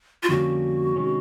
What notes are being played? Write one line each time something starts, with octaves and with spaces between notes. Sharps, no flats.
F4
F2 D3 G3 A#3 C#4 F#4
C3 D#3 G#3 C#4